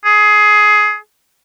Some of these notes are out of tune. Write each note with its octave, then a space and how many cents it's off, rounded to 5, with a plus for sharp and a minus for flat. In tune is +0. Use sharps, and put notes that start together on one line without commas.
G#4 +20